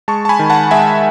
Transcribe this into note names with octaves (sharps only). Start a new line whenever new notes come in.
G#3 A5 C#6
A5
G#5 B5
D#3
F#5 A5
G#3 E5 G#5